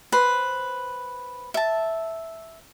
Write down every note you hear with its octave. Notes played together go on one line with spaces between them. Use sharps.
B4 C5
E5 A5